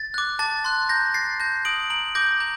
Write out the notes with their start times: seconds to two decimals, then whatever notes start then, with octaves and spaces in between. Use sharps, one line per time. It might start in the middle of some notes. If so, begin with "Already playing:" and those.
Already playing: A6
0.14 D6 F#6
0.39 A5 A6
0.64 C6 F#6 A6
0.89 A#5 G6 A#6
1.14 F#6 A6 C7
1.40 A5 G6 A#6
1.65 D#6 G6 D7 F#7
1.90 A#5 D7 F#7
2.15 D6 G6 A#6
2.40 A#5 G6